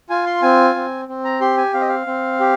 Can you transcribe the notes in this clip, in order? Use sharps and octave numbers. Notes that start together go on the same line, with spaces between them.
F4 G#5
C6
C4 G#5
C4
C4
A#5
G4 C6
G#5
C4 F5
D#5
F5
C4
G4